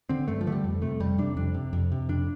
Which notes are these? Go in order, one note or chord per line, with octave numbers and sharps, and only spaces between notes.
D3 C4
G2 A3
F3
D3 A3
G3
F2
C3 A3
F2 G3
C3 D4
F2 D4
C3
F2
C3
F2 D4